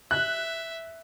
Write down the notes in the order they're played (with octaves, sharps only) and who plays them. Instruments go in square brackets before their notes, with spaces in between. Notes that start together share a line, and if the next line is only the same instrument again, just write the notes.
[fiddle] E5 [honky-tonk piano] F#6